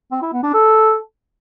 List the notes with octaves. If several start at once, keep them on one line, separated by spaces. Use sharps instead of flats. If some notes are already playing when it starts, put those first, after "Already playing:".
C4
E4
B3
D4
A4